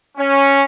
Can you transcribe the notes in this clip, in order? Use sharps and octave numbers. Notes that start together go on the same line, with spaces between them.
C#4